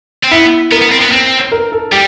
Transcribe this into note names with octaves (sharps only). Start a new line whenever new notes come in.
C4
B3 E4
B3 A#4
B3
C4
B3
C4
A#4
A4
G3 G4